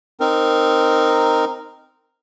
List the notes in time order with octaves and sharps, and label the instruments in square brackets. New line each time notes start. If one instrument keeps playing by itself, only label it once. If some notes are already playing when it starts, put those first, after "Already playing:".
[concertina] C4 D#4 A#4